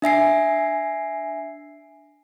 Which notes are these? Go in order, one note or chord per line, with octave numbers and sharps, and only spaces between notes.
D4 E5 G#5 C7